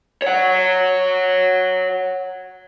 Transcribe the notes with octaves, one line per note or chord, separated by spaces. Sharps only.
C#5 F#5